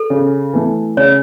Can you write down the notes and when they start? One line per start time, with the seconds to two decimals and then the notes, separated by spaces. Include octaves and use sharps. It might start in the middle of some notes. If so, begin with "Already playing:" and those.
Already playing: A4
0.10 C#3
0.54 E3 A3
0.97 C#3 C#5